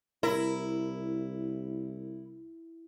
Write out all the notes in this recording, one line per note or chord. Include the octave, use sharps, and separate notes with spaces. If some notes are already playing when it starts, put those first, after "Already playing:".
C2 E4 A#4